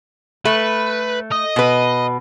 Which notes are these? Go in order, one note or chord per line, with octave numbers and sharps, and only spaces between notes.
A3 B4
D#5
B2 B4